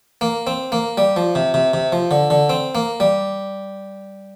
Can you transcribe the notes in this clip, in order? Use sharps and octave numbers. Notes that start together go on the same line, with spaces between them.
A#3
C4
A#3
G3
F3
C3
C3
C3
F3
D3
D3
C4
A#3
G3